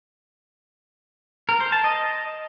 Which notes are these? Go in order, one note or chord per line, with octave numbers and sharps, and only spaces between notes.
A#4
C5
A5
D#5